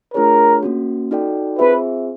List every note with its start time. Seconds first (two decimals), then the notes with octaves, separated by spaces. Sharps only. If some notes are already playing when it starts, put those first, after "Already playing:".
0.14 A3 D4 F4 G#4 A#4 C#5
0.63 A#3 C#4 F#4
1.11 D#4 F#4 A4 D5 G5
1.59 C4 F4 G#4 B4 C5 E5